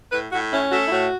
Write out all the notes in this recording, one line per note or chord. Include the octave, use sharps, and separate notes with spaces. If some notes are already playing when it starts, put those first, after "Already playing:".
A2 B4
A2 F#4
C#4 E4
A3 F#4
E4
A2 F#4